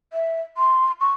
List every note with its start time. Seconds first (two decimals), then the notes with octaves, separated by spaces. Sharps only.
0.13 E5
0.57 C6
1.01 C#6